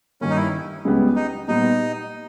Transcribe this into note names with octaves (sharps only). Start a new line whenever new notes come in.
G2 D#3 A#3 C#4
D#4
E4
C#2 C#3 G3 B3 G4
D#4
A#2 G3 B3 D#4